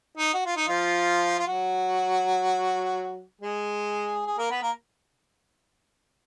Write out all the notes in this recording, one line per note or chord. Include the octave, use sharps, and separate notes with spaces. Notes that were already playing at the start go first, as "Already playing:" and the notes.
D#4
F#4
F4
D#4
F3 F4
F4
F#3 F#4
G#3 G#4
G#4
A#3 A#4
B3 B4
A#3 A#4